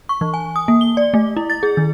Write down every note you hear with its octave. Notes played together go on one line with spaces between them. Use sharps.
C#6
E3
G#5
D#6
A#3
G7
D5
A3
E4
A6
G#4
D#3